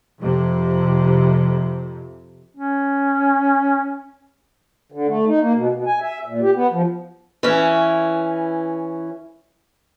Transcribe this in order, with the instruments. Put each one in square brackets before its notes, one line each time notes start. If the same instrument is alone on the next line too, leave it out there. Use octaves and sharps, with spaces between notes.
[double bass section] F2 C3
[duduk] C#4
[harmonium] D3
A3
D#4
A#3
B2
B2
G#5
E5
A#2
G4
B3
F3
[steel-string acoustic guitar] E3 C#4